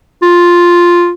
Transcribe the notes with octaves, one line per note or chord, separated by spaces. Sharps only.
F4